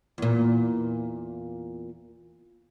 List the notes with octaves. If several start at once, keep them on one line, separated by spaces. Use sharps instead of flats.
E2 A#2